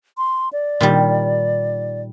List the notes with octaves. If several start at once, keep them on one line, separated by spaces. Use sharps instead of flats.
C6
D5
A#2 D#3 G3